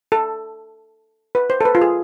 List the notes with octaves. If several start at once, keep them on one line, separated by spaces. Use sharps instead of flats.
A4
B4
C5
A4
B4
F4
G#4